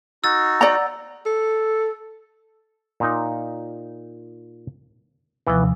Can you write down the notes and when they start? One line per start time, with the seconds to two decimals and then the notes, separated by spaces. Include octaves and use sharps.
0.24 D#4 F#4 E6 A6
0.61 D5 F#5 A#5
1.26 A4
3.00 A#2 D#4
5.47 D#2 C3 E3 F3 B3